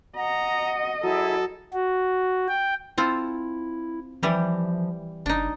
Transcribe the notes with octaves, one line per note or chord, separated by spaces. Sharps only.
D#5 F#5 A#5
F#3 E4 G#4 A4
F#4
G5
C4 E4 F4 A4
E3 F3 G3 G4
F#1 D4 D#4